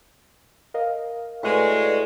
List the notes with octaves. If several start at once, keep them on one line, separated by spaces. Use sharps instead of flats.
A#4 D#5 F5
A2 G#3 F#4 B4 D5